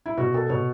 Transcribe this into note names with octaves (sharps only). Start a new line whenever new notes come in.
E4
B2 F#4
A4
B2 C#5